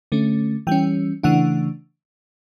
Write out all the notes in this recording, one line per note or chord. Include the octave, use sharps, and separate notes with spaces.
D3 A3 C#4
E3 G3 C#4 G5
C#3 E3 A3 D4 F#5